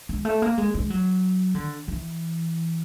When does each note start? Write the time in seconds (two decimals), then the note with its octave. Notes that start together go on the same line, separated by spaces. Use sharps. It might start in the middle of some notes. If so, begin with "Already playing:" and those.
0.09 G#3
0.25 A3
0.42 A#3
0.58 G#3
0.74 G#3
0.90 F#3
1.55 D3
1.88 E3